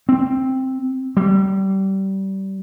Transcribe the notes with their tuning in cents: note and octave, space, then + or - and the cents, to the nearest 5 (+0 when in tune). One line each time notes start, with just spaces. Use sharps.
C4 +5
G3 -25